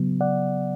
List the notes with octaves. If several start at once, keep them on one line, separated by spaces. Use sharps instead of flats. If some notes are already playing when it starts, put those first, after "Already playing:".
Already playing: C#3 F#3 B3
D5 F#5